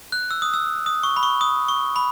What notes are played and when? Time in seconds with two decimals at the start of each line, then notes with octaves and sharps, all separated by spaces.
0.12 F#6
0.31 E6
0.42 D#6
0.53 E6
0.86 D#6
1.03 C#6
1.17 B5
1.23 C#6
1.41 D#6
1.69 C#6
1.96 B5